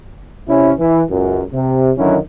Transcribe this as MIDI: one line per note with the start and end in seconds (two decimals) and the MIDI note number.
0.49 0.72 48
0.49 0.72 61
0.49 0.72 64
0.79 1.03 52
1.09 1.42 37
1.09 1.42 42
1.53 1.92 48
1.98 2.17 42
1.98 2.17 50
1.98 2.17 51
1.98 2.17 54
1.98 2.17 61
1.98 2.17 64